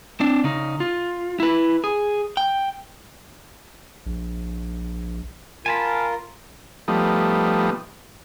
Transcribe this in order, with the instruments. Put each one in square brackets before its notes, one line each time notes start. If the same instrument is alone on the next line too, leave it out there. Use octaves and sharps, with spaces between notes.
[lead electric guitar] C4 D4
C#3 D#4
F4
E4 B4
G#4
G5
[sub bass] A#1
[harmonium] F4 A#4 [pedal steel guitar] G#5 A5 B5
[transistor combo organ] F3 G3 A3 B3 D#4